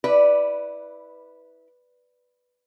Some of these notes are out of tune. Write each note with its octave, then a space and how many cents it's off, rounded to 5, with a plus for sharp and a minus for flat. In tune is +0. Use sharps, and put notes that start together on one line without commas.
E4 -20 B4 +0 D5 +0